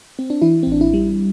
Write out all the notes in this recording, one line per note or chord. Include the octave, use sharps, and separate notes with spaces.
C4
D4
E3 E4
C4
A1 D4
E4
G3